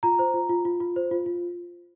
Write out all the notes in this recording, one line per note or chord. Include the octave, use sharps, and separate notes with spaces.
F4 A#5
C5
F4
F4
F4
F4
C5
F4
F4